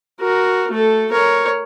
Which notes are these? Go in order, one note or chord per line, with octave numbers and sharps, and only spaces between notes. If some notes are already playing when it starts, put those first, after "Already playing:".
F#4 A#4
A3 A4
A#4 C#5